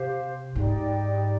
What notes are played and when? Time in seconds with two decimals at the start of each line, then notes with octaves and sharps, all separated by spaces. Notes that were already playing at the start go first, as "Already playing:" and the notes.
Already playing: C3 G4 C5 F5
0.55 G#2 D#4 G4 D5 G5